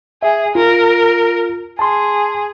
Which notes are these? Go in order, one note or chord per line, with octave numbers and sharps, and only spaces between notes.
G#4 E5
F4 A#4
G#4 A5 C6